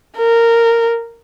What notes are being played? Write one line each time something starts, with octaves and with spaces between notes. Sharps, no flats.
A#4